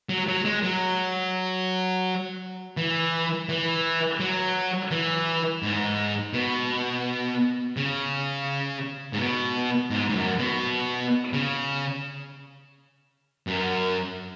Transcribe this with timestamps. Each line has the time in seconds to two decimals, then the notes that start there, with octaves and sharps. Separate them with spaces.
0.09 F#3
0.28 F#3
0.45 G#3
0.63 F#3
2.77 E3
3.49 E3
4.20 F#3
4.91 E3
5.63 G#2
6.33 B2
7.77 C#3
9.13 G#2
9.19 B2
9.90 G#2
10.10 G#2
10.15 F#2
10.38 B2
11.33 C#3
13.47 F#2